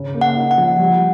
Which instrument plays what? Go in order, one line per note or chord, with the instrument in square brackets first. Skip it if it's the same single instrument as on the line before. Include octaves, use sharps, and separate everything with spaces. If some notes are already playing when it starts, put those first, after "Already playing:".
Already playing: [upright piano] C#3
A#3
[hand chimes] F#5
[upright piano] D#4
[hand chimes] F#5
[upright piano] F3
G3